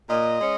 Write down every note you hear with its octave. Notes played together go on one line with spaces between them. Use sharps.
A#2 D#5
G#3 C#4